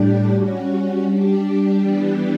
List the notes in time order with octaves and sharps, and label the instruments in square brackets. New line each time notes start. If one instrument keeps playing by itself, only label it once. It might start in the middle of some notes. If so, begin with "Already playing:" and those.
Already playing: [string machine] A2 G3 D4 G4
G3 C#4 F#4
G3 D4 G4
E3 G3 B3 D4 G4